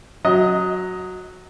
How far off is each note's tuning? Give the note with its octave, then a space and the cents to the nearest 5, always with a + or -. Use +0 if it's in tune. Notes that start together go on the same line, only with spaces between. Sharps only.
F#3 -5 D#5 +10